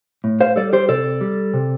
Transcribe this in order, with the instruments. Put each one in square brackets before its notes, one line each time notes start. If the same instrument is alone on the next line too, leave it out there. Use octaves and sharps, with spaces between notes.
[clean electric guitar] A2
C5 F5
G3 A4 D5
G4 C5
C3 A4 D5
G3
C3